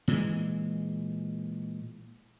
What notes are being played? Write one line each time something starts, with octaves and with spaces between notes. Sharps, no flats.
A#2 E3 G#3